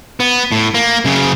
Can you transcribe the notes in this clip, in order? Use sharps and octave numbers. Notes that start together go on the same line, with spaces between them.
B3
A2
A#3
F#2 C#3